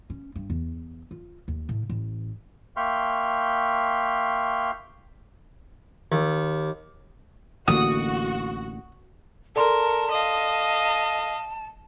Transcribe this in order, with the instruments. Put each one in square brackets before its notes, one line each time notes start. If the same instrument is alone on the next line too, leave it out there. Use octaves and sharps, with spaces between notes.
[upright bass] C#4
G2
E2
F4
D#2
A2
A1
[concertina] A#3 E5 G5 C6 C#6 F6
[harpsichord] D#2
[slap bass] A1 D3 A#3 [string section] F#4 [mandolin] D#6
[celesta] A4 D5 C6 [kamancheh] A#4 [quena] A5
[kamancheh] D#5 F5